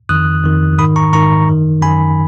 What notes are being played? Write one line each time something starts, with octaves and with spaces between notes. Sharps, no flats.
F2 D#3 D#6 F#6
F2 D#3
G#2 D#3 B5 D#6
A#5 C#6
G#2 D#3 A#5 C#6
F#2 D#3
F#2 D#3 G#5 B5